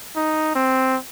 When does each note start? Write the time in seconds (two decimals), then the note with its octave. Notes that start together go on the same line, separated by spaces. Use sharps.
0.16 D#4
0.55 C4